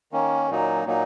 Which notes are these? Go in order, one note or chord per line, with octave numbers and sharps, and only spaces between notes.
D#3 A#3 C#4
A#2 F#3 A#3 D#4
A#2 F#3 A#3 D#4